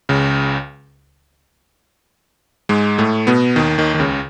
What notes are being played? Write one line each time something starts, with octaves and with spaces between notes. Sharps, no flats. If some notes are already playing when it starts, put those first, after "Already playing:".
C#2 C#3
G#2 G#3
A2 A3
B2 B3
D#2 D#3
D#2 D#3
D#3
C#2 C#3